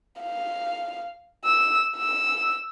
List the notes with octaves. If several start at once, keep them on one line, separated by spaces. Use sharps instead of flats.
F5
E6
E6